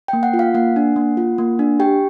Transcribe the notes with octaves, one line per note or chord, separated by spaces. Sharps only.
A#3 G5
F#5
F4
F5
A#3 F#5
D4
A#3
F4
A#3
D4
G4 G5